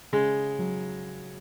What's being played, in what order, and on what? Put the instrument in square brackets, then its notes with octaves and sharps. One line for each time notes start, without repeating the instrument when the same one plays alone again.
[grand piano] C#3 [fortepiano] G#3
[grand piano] F#3